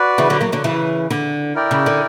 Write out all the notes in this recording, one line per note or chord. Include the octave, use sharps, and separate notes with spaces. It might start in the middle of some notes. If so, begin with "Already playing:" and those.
Already playing: F#4 B4 D5
C#3 E3
D3 F#3
F#3 A#3
D3 F#3
C#3 E3
D3
E4 A#4 D5 G5
C#3
D3